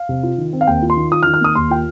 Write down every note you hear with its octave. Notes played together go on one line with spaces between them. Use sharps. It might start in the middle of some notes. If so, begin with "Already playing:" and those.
Already playing: F5
C3
F4
D#3
C4
F5
D#2 G5
F4
C6
D#3
F4 D#6
F6
D#3
F6
A#3 D#6
D#2 C6
F4 G5